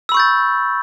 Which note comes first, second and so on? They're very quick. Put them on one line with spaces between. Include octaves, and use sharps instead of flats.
E6 B5 C#6 G6 A6